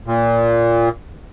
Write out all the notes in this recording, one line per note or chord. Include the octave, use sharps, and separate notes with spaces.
A#2